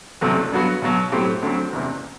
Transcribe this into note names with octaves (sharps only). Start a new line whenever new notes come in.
F#1 E2 C3 F#3 A3
G2 F#3 B3 F#4
B1 B2 F#3
A2 F#3 C4 G4 C5
D2 D3 F#3 C4
F#1 E2 C3